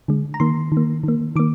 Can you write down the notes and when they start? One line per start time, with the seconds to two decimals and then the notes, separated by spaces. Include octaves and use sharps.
0.08 D3 G#3
0.34 A#5
0.40 D#3 A#3 C6
0.72 D#3
0.77 A#3
1.03 D#3 A#3
1.36 D#3 A#3 D6